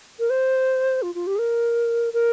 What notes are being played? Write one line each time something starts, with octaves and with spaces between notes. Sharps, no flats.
A#4
C5
F4
F4
G4
G#4
A#4
A#4